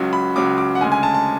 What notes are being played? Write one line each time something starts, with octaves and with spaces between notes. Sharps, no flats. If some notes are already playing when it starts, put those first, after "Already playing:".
Already playing: C#2 C#3 F#3
B5
C#2 C#3 F#3 D6
D6
F#5
D2 C#3 G#3 G#5
G#5
A5
A5